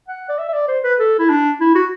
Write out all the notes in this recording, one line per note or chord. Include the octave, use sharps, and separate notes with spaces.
F#5
D5
E5
E5
D5
C5
B4
A4
E4
D4
E4
F#4